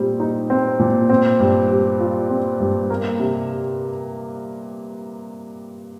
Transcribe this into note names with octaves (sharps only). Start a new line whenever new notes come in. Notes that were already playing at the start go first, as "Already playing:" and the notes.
Already playing: A#2 G3 C4
D#4
C4
A#2
C4
G2
G3
F4
C4
G2
A#3
C3